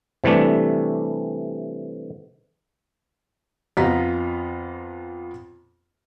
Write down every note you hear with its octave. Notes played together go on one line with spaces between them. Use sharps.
C3 E3 G3 A3 D4
F2 B3 F4 A#5 B6